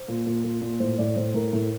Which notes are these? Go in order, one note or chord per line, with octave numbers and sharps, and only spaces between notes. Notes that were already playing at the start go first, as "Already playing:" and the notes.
Already playing: C5
A#2
A#2
A#2
A#2
A2 C5
A2 D5
A2 C5
A2 A#4
A2